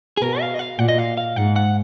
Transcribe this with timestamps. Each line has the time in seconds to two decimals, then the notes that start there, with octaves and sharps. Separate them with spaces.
0.17 G#4
0.21 B2 A#4
0.41 F5
0.54 D#5
0.59 F5
0.79 A#2 F#5
0.89 D#5
0.98 F5
1.17 F5
1.36 G#2 F#5
1.56 F#5